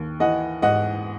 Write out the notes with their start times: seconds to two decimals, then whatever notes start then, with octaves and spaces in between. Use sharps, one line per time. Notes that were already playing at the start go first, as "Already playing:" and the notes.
Already playing: D#2
0.20 E3 D#5 F#5
0.62 G#2 D#5 F#5